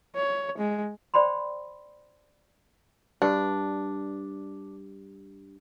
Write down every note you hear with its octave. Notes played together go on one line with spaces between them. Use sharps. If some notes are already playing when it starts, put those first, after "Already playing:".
C#5
G#3
C5 D5 G5 B5 C6
G2 D4